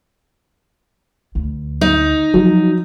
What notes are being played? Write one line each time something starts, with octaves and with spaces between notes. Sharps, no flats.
D2
D#4
F3 F#3